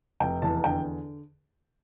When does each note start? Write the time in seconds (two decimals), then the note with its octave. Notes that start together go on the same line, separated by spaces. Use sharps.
0.20 F1 G5
0.42 E2 A5
0.64 D3 G5